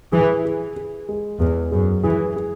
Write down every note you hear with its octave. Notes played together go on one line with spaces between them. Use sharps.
E3 G#4
G#4
G#4
G#3
E2 G#3
F#2 G#4
E3 G#4
G#4